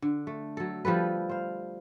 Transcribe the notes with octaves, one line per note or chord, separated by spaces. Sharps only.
D3
A3
F#3 A4
F3 G3 A4 B4
C5 F5